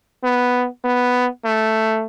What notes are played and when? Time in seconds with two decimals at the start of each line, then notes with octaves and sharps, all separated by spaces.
0.23 B3
0.84 B3
1.45 A3